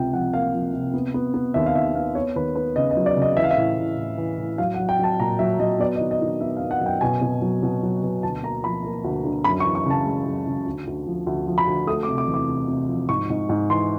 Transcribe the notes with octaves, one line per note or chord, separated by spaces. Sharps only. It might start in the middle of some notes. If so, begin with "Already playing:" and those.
Already playing: C#2 C3 G5
F3 F#5
A#3 F5
F3
C3
B3
B3
B3
D#2 E5
F5
D#2 E5
B3 F5
B3 C#5
D#2 B4
B3 B4
C#3 D#5
D#5
F#3
D5
C#3
D#5
E3 E5
F5
E5
A2
A2
A2
E3
A2
F#3 F5
F#5
F#3
G5
F#3 A5
A#2 A#5
F#3 E5
F#3 D#5
B3 D5
D#5
D#3
D#5
D#3
B3 E5
F5
B3
F#5
F#2
G5
B2 G#5
B2
F#3
B2
F#3
B2
D2 A5
A#3 A#5
F3 B5
A#3
D2
D3
F#2 B5
C#6
E3
C#6
C#3
A5
G#3
F#2
C#3
D2
D2
F3
D2
F3
B5
D2
A3 D#6
D6
C3
D6
E2
D6
C3
C3
F3
G#2 C#6
G#2
G#2
E3 C6